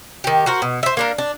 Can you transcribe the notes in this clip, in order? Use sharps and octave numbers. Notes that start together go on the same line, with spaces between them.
D#3 G4
F#4 A#4 C5
B2
C5 E5
A#3 D4 A#4
D4